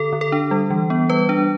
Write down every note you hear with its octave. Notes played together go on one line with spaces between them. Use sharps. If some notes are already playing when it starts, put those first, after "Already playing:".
Already playing: D3 A4
D3
A4
D4
G3
E3
B3
G3 B4
D4